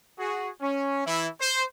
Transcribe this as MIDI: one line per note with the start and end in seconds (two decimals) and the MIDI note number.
0.19 0.49 66
0.19 0.49 68
0.61 1.06 61
1.06 1.27 52
1.06 1.27 64
1.40 1.63 72